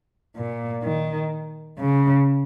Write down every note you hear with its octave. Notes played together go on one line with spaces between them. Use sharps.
A#2
D#3
C#3